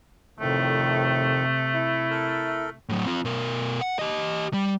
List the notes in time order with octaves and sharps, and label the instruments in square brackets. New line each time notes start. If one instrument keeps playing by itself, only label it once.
[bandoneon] F2 D#3 [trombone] A2 [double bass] C3 [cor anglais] A3
[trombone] E4
[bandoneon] A4 A#4
[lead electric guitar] A2 F#3
C4 F4
B2 A#4
F#5
G4 D#5
G3